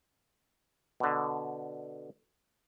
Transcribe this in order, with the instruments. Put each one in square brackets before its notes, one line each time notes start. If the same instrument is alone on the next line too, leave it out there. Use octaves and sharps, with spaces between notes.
[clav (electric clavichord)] B2 D3